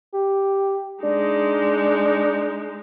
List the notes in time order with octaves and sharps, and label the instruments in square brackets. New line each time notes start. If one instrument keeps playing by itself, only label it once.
[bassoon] G4
[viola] G#3 D#4 [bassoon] D4